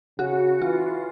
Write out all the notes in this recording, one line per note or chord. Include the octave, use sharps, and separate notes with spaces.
C#3 F#4
E3 F4